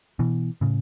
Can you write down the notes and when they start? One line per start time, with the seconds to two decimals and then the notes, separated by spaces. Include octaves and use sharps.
0.19 B2 E3
0.61 A2 C#3